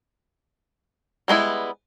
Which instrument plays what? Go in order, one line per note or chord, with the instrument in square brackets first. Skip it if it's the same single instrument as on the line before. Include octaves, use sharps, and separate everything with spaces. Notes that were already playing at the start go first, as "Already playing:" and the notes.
[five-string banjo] G3 G#3 B3 E4